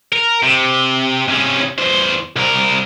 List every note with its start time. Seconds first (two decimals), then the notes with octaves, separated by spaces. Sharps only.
0.12 A#4
0.44 C3
1.28 C3 C#4
1.78 E2 C5
2.36 C2 A#4